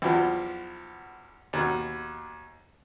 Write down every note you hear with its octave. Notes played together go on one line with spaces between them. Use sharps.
B1 E2 F3
D#2 B2